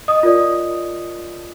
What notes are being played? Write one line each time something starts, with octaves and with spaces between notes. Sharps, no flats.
D#5 D#6
F4 A#4 D5